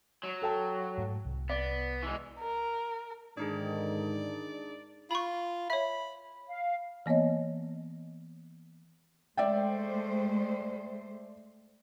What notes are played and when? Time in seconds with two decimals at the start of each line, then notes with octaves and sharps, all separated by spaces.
0.23 F#3
0.42 A4 G5 A5
0.98 G#2 A3
1.25 C2
1.49 B3 D5
2.03 E3 G#3
2.39 A#4
3.37 G#2 D3 D#3 D4 D#4 G#4 D5
5.11 F4 B5 C#6
5.70 C#5 E5 B5
6.48 F5
7.06 E3 A#3 B3 C#5 D#5
9.37 G#3 A3 C5 D5 E5 G5